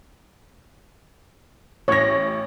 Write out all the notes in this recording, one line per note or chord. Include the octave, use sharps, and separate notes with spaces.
A1 C#5 A#6